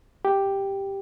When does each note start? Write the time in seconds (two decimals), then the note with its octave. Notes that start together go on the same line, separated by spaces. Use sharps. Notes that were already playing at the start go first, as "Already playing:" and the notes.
0.25 G4